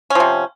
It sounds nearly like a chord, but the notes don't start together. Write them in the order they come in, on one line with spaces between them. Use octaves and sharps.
C#4 F3 C3